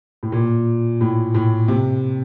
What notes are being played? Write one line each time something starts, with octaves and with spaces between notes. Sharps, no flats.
A2
A#2
A2
A2
C3